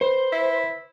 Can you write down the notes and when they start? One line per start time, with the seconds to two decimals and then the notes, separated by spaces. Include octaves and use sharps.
0.01 B4 C5
0.32 E4